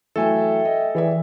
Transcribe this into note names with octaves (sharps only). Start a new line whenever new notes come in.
E3 F#3 A3 A4 E5 G5 G#5
D#5
E3 G#4 D5 E5